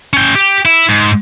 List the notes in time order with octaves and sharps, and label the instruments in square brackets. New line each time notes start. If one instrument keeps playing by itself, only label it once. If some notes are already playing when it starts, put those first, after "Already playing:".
[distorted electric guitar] C#4 G5
G4
E4
G#2